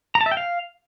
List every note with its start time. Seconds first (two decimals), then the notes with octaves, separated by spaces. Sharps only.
0.15 A#5
0.21 A5
0.26 E5
0.32 G5
0.37 F5